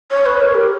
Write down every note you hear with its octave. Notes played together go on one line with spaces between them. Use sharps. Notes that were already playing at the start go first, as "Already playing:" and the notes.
C#5
B4
A#4
G4